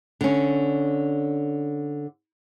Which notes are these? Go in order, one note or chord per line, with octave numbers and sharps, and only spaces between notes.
D3 C#4